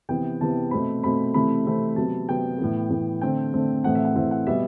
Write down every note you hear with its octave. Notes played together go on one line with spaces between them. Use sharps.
C3 E3 B3 G5
C3 E3 B3 A5
B2 A3 C4 B5
B2 A3 C4 B5
C3 E3 A3 C4 B5
C3 E3 A3 C4
C3 F#3 B3 A5
C3 F#3 B3 G5
A2 E3 B3
A2 E3 B3
D3 A3 C4 G5
D3 A3 C4
A2 E3 A3 C4 F#5
E5
F#5
A2 E3 A3 C4 E5
F#5
B2 G3 B3 E5